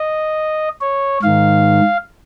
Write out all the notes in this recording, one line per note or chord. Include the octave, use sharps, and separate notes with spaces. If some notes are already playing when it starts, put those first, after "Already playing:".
Already playing: D#5
C#5
G#2 D#3 F5